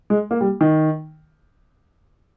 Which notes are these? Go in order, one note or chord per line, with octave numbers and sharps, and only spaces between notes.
G#3
A#3
G3
D#3